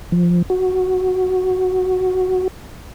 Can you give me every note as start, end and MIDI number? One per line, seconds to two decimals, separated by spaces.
0.12 0.42 53
0.50 2.48 66